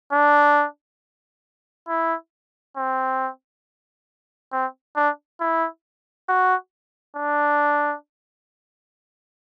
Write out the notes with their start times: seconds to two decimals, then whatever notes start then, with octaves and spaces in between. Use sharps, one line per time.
0.13 D4
1.88 E4
2.77 C4
4.52 C4
4.96 D4
5.40 E4
6.28 F#4
7.16 D4